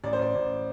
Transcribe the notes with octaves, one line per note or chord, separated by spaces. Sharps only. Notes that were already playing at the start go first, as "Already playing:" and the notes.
A1 D5
C5
A1 D5
A1